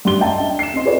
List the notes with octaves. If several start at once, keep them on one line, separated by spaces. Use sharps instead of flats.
G2 G4 C6 G7
D#5 E5 G5 A5 A#5
D4
C7 E7
C4 D#4 D#5 C6
F4 G#4 A4 B4 C#5 D5